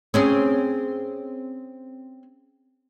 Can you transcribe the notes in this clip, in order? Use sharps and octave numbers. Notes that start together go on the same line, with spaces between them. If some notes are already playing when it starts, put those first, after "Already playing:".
C4 C#4 G#4